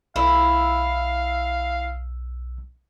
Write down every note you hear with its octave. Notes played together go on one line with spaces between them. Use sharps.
B1 E4 F5 E6